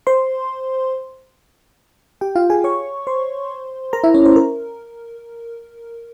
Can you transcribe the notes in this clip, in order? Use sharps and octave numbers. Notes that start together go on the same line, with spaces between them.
C5 C6
G4 G5
F4 F5
G#4 G#5
C#5 C#6
C5 C6
A#4 A#5
E4 E5
C#4 C#5
C5
A#4